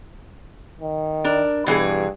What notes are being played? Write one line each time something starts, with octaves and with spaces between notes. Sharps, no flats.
D#3
D4 A#4
G2 B2 E3 G#4